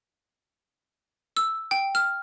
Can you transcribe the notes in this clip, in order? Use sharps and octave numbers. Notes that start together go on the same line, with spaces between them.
E6
G5
F6